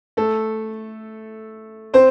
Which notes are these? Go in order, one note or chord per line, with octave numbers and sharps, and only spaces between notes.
A3 A4
C4 C5